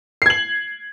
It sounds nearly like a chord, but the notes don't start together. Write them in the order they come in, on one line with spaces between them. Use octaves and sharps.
C7 G#6 F#7